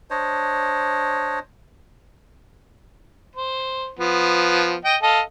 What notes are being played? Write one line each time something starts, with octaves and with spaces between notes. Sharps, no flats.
D4 C5 C#5 D#5
C5
F3 B3
D#5 G5
A4 D#5 F5